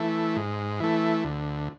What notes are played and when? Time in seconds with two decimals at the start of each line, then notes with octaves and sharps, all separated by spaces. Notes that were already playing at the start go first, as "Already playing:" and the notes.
Already playing: E3 A3
0.36 G#2
0.80 E3 A3
1.25 D2